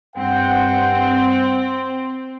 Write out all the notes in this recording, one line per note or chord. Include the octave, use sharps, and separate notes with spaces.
G2 C4 F#5 G5